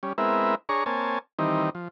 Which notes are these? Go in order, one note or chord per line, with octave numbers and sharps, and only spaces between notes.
G3 C#4
G#3 B3 C4 E4 A#4 E5
D4 G#4 C#5 A#5 C#6
A#3 C4 C#5 G#5 A5
D#3 E3 G3 C4 D#4
F3